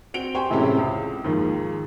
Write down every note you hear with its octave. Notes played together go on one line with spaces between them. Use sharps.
C4 F#4 D7 F7 G7
G4 C5 G5 G#5 C#6
A2 C3 E3 G#3 C#4 E4
C#2
D#2 G#2 D#3 F3